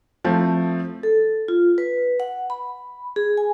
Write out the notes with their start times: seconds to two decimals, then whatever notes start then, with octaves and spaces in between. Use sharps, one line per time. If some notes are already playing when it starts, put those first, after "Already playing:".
0.24 F3 A3 C4 E4
1.03 A4
1.48 F4
1.78 B4
2.20 F#5
2.50 B5
3.16 G#4
3.37 G#5